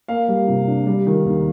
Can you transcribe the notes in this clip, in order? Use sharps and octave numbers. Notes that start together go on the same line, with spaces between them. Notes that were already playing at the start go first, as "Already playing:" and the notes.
A#3 F5
G3
C3
D4
G3
D#3
D#2